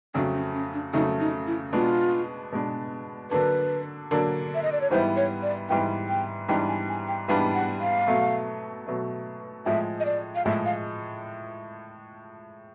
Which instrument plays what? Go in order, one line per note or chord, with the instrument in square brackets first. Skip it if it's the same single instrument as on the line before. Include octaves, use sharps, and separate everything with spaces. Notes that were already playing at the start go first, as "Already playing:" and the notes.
[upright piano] F2 C#3 F#3 A3 [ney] D4
[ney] C#4
C#4
D4
[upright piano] F2 C#3 F#3 A3 [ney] D#4
[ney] D#4
E4
[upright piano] B2 G#3 B3 D4 [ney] F4
[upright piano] B2 G#3 B3 D4
[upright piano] D3 F#3 A#3 D4 [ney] B4
[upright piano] D3 F#3 A#3 D4
[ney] E5
D#5
D5
C#5
[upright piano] G#2 E3 G3 B3 E4 [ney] C5
[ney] C#5
D5
[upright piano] G#2 E3 G3 B3 E4 [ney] G5
[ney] G5
[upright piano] G#2 E3 G3 B3 D4 [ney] G5
[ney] G#5
G#5
G5
[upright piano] G#2 E3 G3 B3 D4 [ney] F5
[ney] F#5
F5
[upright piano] B2 F#3 A3
B2 F#3 A3
[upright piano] A2 F3 G#3 [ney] E5
[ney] D#5
D5
F5
[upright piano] A2 F3 G#3 [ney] E5
[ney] F5